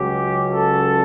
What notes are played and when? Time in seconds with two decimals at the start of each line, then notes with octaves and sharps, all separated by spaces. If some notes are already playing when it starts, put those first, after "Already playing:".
Already playing: C#2 C#3 F#3 C#4 G4
0.48 A4